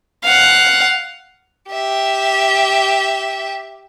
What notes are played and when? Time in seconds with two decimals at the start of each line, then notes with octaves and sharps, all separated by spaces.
0.24 F5 F#5
1.72 G4 E5